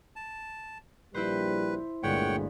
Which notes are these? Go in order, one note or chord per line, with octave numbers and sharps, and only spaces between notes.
A5
A#1 G3 E4 B4 C5
G1 D2 A#2 G#3 C#5 F#5 G5